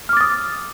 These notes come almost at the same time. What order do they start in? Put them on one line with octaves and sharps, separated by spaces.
F6 D6 A6 D#6